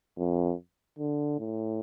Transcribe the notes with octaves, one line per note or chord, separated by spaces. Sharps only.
F2
D3
A2